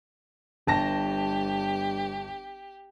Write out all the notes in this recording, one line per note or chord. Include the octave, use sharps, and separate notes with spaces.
G1 G2 G4 A5 A#6